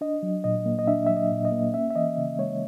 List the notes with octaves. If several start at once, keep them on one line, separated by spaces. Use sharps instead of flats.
D4 D#5
F#3
A#2 D#5
A#3
D#5
D4 E5
F#3 E5
D#5
A#2
D#5
A#3
C#4 E5
E5
E3 D#5
C#3
G#3 C#5